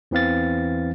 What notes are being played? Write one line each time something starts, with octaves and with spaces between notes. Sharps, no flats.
E2 E3 C4 F5 A6